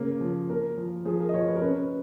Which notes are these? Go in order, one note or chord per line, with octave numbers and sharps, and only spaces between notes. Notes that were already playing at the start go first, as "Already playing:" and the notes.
Already playing: C#3 A#3
F3
A#3 A#4
F3
F3 G#4
A#4
D#5
F3 C#5
B4
A#4
C#4 B4